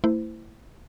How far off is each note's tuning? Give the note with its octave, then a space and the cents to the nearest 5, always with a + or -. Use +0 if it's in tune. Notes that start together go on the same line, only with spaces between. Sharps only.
A3 +30 E4 +0 C5 -25